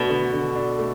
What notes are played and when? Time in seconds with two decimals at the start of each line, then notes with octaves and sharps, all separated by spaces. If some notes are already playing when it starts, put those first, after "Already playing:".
Already playing: B2 A3 D4
0.09 D3
0.33 D3
0.56 D4
0.79 A3